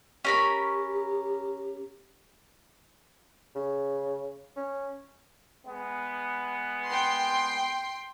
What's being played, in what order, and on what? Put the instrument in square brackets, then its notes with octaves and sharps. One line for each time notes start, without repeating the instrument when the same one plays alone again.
[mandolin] C#4 A#4 B5 [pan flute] G4
[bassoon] C#3
C#4
[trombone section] G#3 B3
[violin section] G5 C6